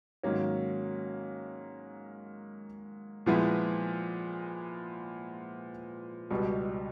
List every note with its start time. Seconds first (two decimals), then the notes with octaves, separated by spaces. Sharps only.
0.23 G#2 D#3 F#3 A#3 C#4
3.26 A#2 F3 G#3 B3 E4
6.30 C#2 B2 G3